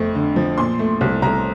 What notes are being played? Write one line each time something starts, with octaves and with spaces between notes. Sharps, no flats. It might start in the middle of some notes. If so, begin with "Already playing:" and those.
Already playing: F2 A3
D3
F3
A#2 C6
A3
C2
C2 A#5